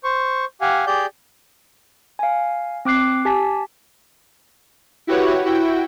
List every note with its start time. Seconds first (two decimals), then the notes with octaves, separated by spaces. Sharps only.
0.04 C5 C#6
0.61 G4 F5 F#5 G#5
0.87 G4 G#4 D5 G6
2.19 F5 G#5
2.85 C4 D6 F#6 C7
3.25 G4 G#5 A5 B6
5.07 E4 F#4 G4 B4 C#5 F#5
5.45 E4 F#4 G5